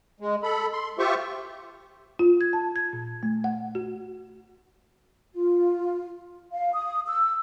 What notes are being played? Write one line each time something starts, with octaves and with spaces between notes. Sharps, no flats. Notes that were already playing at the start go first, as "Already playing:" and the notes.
G#3
A4 B5
C6
F4 G4 C5 E5 C#6
F4
G#6
A5
G#6
A#2
A3
F#5
F#4
F4
F5
D#6
E6